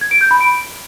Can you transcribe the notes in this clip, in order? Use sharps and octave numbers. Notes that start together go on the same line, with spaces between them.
G#6
D7
G6
B5
D7